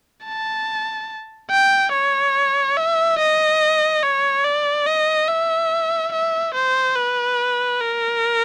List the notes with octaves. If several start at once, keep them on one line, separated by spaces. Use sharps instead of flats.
A5
G5
C#5
E5
D#5
C#5
D5
D#5
E5
E5
C5
B4
A#4